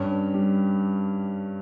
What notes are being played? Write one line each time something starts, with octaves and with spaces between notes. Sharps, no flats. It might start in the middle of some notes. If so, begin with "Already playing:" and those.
Already playing: G2 C#4
G3